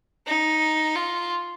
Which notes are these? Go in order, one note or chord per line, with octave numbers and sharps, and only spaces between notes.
D#4
F4